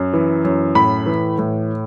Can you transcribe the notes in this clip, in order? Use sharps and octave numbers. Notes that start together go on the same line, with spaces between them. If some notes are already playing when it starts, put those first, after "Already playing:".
Already playing: F#2
E3
F#2
A2 B5
E3
A2